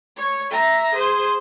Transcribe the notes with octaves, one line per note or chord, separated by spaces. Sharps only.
C#5
E5 A#5
G#4 C5